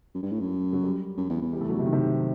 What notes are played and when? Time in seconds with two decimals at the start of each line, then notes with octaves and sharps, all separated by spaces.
0.14 F#2
0.23 G2
0.31 A2
0.40 F#2
0.73 F#3
0.84 G3
1.18 F#2
1.30 E2
1.41 E2
1.53 G3
1.61 A3
1.70 F#3
1.79 C3
1.86 D#3
1.93 C3